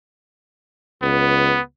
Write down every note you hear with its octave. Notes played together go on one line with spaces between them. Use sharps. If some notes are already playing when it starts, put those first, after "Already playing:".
C#2 B3